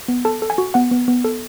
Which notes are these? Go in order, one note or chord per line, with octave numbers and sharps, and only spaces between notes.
B3
A4 A5
A4
G#5
F#4
B3 F#5
B3
B3
A4